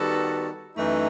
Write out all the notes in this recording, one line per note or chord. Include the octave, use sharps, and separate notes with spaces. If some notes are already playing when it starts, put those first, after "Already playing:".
Already playing: D#3 G3 B3 F#4 A4
F#2 E3 A3 D#4